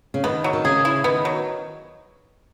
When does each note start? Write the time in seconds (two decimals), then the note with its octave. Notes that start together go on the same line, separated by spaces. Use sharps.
0.14 C#3
0.24 D#3 B3
0.44 F#3
0.53 D#3
0.65 C#3 G#4
0.85 E4
1.04 D#3 B3
1.25 F#3